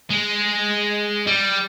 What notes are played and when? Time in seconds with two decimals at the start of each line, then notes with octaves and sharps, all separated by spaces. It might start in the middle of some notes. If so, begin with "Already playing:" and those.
0.10 G#3
1.27 G3